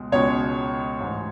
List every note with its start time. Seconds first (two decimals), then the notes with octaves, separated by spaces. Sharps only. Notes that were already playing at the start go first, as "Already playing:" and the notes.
Already playing: C#2 B2 G#3
0.12 C#2 B2 G#3 C#5
1.00 A1 G#2 G#3